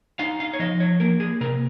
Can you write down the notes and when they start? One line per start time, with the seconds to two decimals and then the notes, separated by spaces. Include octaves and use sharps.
0.19 D#4 F5
0.40 F5
0.53 C#5
0.59 F3 D#5
0.80 C#5
1.00 A#3 A#4
1.20 G#4
1.41 C3 A#4